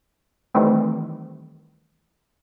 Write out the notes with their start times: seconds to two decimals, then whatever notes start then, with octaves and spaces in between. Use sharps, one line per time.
0.54 D#3 E3 G3 A3 C4